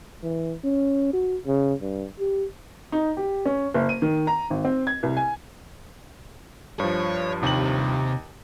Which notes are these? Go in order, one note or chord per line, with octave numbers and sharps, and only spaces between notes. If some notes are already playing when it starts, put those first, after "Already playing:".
E3
C#4
F#4
C#3
G2
G4
D#4
G4
C#4
F#1
D#7
D#3
A#5
G#1
C4
G#6
C2
G#5
G2 F3 C#5
D#2 C3 F#7